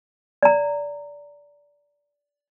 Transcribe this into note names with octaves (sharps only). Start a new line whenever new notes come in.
D5 A#5